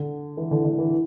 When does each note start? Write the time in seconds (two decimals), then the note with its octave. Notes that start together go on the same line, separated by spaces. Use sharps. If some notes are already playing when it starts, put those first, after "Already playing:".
Already playing: D3
0.37 E3
0.51 D3
0.65 D3
0.78 E3